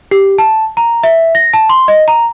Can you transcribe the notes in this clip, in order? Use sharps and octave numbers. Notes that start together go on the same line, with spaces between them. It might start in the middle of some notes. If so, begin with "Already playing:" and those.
G4
A5
A#5
E5
A#6
A5
C6
D#5
A#5